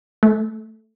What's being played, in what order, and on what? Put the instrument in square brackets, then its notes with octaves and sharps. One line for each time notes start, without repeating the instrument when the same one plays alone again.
[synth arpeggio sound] A3